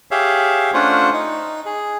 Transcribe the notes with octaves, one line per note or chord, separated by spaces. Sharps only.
G4 G#4 C#5 E5 F5
A3 C#4 D4 F4 C5 F#5
D#4
G#4